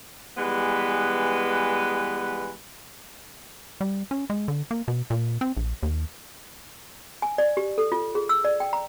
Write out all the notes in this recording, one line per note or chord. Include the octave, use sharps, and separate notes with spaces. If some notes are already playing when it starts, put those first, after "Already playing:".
E3 G3 G#3 B3 B4
G3
C#4
G#3
D3
A#3
B2
A#2
C4
A#1
D#2
G#5
D5
G4
A4
F4
G#4
E6
D5
G5
A#5